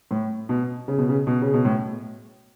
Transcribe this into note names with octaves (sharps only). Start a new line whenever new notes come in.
A2
B2
C#3
B2
C#3
B2
C#3
B2
A2